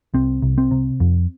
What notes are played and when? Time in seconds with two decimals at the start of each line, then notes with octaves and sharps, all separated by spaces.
0.14 C2 C4
0.42 C2
0.58 C4
0.71 C3
1.00 F2